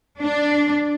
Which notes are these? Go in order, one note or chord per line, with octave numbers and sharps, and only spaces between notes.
D4